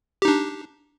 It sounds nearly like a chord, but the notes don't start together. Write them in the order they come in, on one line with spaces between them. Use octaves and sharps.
G4 D#4 D4